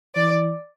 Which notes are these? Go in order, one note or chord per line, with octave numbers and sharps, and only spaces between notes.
E3 D5